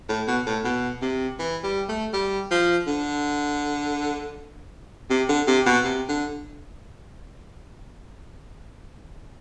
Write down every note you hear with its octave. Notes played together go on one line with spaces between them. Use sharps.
A2
B2
A2
B2
C3
E3
G3
A3
G3
F3
D3
C3
D3
C3
B2
C3
D3